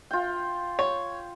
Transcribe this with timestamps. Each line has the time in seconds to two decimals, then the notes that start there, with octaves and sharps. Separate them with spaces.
0.11 F4 G5
0.79 C#5